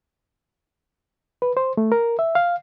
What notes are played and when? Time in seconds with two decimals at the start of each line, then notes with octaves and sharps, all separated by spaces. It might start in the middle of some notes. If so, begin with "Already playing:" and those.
1.42 B4
1.57 C5
1.77 A3
1.92 A#4
2.19 E5
2.35 F5